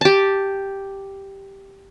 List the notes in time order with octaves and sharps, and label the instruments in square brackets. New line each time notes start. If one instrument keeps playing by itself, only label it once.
[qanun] G4 A5